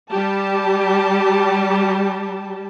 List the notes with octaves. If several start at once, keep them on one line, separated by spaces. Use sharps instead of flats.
G3 G4 A5